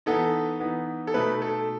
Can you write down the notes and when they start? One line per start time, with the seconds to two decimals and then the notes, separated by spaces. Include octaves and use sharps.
0.06 E3 B3 D#4 A4
0.60 E3 B3 D#4
1.07 A4
1.14 B2 A3 D#4 B4
1.42 A4